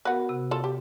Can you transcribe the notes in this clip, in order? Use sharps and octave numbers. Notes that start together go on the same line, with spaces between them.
B3 F#4 A#4 B4 F#5
C3
F4 A4
G4